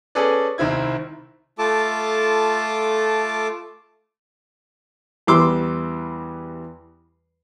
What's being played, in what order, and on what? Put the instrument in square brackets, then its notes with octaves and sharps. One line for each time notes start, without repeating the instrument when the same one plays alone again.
[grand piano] C#4 G#4 A4 B4 D5
C2 D#3 C4 E4 G#6
[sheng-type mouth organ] A3 F4 A4 A5 D6
[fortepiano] E2 E3 G3 C6 D6 E6